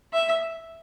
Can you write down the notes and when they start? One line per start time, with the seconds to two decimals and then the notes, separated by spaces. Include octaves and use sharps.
0.13 E5